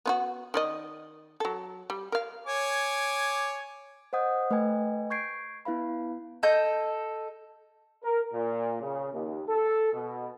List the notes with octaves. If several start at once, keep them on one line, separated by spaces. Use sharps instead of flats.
B3 F4 F#4
D#3 D5 D#5
F#3 A4
G3
A#4 F5
C#5 G#5 D6
C5 D#5 F#5 D#6 G6
A3 B4 D#5 G5 G#5 G#6
C#6 G6 G#6 C7 D7
B3 E4 B4 F5 B5
A4 D#5 G6
A#4
A#2
C#3
D#2
A4
B2